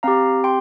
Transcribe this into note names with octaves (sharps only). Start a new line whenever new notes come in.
C4 G4 F5 A#5
G5 C6